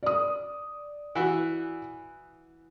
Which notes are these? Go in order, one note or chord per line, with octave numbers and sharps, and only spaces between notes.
D5 D#6
E3 F#4